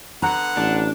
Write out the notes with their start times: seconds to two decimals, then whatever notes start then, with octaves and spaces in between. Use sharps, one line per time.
0.22 D3 B3 F#5 A#5
0.57 A1 D4